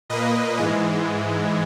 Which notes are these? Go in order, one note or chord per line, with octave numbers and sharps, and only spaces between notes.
A#2 A#3 B4 D#5
G#2 E3 G#3